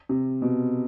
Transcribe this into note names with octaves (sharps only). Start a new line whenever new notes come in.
C3
B2